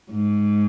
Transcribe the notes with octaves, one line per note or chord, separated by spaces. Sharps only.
G#2